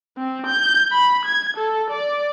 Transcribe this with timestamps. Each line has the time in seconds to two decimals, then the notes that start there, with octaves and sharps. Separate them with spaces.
0.17 C4
0.47 G6
0.92 B5
1.25 G#6
1.57 A4
1.90 D5